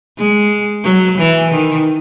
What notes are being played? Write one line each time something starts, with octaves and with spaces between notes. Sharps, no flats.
G#3
F#3
E3
D#3